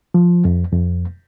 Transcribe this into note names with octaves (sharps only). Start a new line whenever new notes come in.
F3
F2
F2